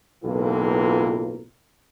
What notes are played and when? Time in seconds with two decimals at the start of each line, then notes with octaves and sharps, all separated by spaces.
0.25 F#1 B1 A2 E3 A#3 F4